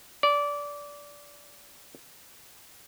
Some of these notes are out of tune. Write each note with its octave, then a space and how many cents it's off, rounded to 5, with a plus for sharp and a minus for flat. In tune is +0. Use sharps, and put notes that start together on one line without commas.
D5 -20